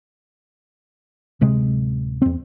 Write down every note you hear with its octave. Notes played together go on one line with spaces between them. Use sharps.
D1 C3 G#3
E2 C4